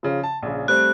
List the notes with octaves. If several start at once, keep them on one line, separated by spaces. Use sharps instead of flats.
C#3 F3
A5
A#1 C#3
G3 A3 C4 F#6